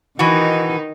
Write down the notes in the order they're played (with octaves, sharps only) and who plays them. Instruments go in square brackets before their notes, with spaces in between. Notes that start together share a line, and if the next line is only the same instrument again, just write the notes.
[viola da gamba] D#3 D#4 [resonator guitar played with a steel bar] E3 F#4